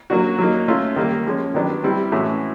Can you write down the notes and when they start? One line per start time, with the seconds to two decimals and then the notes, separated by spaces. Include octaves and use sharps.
0.10 F#3 A#3 D4 F#4
0.39 F#3 A#3 D#4
0.68 A3 C#4 F4
0.96 D#3 G3 A#3
1.26 F3 G#3 C#4
1.54 D#3 F#3 B3 D4 G4
1.84 G3 C4 E4
2.12 A2 E3 G#3 C#4 F#4